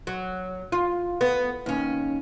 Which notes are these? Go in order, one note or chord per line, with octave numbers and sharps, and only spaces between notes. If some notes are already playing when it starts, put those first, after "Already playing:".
F#3
F4
B3
D#2 C#4